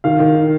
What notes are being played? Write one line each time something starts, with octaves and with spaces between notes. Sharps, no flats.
D#3 F5
D#3